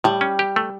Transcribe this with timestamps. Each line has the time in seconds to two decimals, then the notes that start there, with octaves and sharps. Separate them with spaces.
0.04 A2 G3
0.21 C#4
0.39 G4
0.56 A3